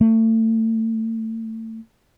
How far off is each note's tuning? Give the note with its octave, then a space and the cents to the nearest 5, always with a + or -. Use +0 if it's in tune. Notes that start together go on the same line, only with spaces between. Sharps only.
A3 +30